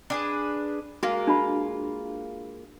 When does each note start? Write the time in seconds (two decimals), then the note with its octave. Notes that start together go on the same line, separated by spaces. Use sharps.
0.10 D4 G#4 B4
1.03 G#3 A#3 F4 F#4
1.27 D4 F#4 B5